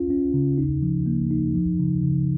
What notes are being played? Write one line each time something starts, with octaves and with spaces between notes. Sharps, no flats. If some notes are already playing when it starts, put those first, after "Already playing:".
Already playing: C#4 F4
C#4
C#3
D#4
F3
A#3
D#4
F3
C#3
C#3